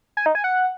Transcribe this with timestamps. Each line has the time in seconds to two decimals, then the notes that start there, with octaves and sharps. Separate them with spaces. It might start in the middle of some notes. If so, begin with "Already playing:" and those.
0.17 G#5
0.26 D#4
0.35 G#5
0.44 F#5